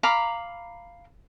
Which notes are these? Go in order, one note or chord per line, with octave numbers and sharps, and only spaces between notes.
F5 A#5 B5 D6